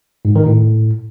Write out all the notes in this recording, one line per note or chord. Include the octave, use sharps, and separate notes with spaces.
G#2
D#3
A2